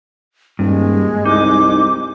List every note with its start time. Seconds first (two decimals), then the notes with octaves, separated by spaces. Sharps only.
0.59 D#1 G2 G#3
1.26 C2 D#4 D6